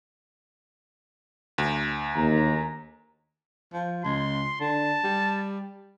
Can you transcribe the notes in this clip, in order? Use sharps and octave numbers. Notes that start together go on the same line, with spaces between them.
D2
D#2 A#5
F3
C#2 C6
D3 A5
G3